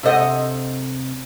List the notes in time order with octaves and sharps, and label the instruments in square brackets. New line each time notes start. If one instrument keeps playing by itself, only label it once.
[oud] C3 D#5 [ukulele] A4 C5 F#5